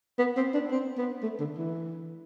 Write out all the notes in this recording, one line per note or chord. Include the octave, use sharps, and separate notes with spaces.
B3
C4
D4
C4
B3
A3
D3
E3